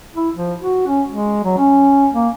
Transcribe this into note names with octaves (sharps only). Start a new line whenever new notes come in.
E4
F3
F#4
C#4
G#3
F#3
C#4
A#3